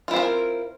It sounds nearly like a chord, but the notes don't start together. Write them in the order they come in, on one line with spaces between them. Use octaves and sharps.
F4 E4 C4 A#4